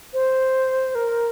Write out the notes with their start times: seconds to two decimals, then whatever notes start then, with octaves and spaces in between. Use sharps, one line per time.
0.13 C5
0.95 A#4